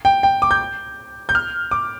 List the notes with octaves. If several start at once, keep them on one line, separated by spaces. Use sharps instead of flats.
G5
G5
D6
G6
G6
F6
D6